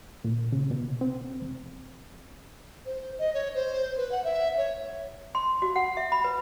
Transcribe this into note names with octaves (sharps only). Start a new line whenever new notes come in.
A#2
C#3
B2
C4
F1
C5
D#5
C#5
C5
B4
F#5
E5
C#5
C6
F#4
F#5
E5
B5
B4